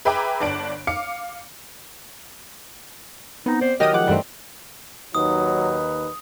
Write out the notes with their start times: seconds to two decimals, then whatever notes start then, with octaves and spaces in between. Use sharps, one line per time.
0.05 G#4 B4 E5 G5 A#5 D6
0.41 G1 D4 D7
0.87 F5 D6 C#7
3.46 B3 C4 D#4
3.61 C5 D5
3.80 D#3 F#3 G4 D#5 D#6 F6
3.94 F3 G#3 F#5 D6
4.07 G2 E3 G3 A3 C4
5.15 D#2 F#3 D#4 B4 D#6